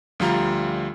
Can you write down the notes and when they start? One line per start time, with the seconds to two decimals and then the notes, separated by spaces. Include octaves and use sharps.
0.20 D2 F3 G3 F4 A#5